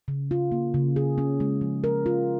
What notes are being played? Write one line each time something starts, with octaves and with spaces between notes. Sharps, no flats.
C#3
F4
A#3
C#3
G#4
C#4
G#3
F3
A#4
F4